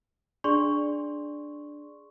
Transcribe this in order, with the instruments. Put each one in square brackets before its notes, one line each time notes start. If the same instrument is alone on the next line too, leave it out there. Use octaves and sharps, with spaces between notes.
[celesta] D4 G#4 D5 C6 C#6